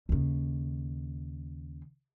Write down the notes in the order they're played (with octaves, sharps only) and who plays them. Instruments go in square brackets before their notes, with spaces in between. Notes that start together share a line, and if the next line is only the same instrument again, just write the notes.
[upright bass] D#2 C#3